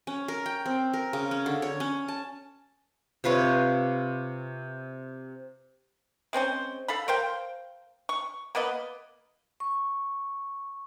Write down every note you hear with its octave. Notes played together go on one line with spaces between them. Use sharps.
C#4
A#4
G5
C4
A#4
C#3
C#4
D3
C#5
C#4
A5
C3 F4 B4 C#5
G#3 C4 C#4 C5
A4 F5 B5
A#4 C5 F5 G5
C#6
A#3 B3 B4 D#5
C#6